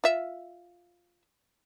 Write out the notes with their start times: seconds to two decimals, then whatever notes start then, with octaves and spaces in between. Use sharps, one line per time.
0.04 F4 E5